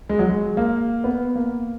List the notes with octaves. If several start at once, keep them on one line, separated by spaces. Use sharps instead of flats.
G#3
F#3
G#3
A#3
B3
A#3